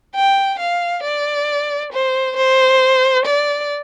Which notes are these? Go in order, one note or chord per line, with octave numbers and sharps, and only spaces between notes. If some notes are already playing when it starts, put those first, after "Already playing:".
G5
F5
D5
C5
C5
D5